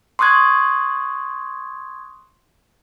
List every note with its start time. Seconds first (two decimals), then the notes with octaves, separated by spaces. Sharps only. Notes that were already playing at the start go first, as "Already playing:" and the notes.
0.19 C6 C#6 D#6 F#6 G#6